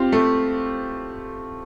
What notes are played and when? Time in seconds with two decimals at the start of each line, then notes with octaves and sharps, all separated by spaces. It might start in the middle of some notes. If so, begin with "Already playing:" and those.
Already playing: C4 F4 G4
0.12 A3